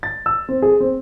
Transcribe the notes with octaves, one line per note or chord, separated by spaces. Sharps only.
A6
E6
C4
G#4
C4